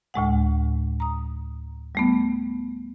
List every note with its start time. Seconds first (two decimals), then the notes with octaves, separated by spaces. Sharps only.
0.14 D2 A2 G#3 F#5
1.00 A#5 D#6
1.95 G3 A3 B3